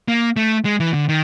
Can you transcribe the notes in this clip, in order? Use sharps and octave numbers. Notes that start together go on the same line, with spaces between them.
A#3
A3
G#3
E3
D3
D#3